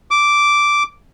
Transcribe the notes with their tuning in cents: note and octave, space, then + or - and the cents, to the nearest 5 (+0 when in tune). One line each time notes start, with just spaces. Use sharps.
D6 -5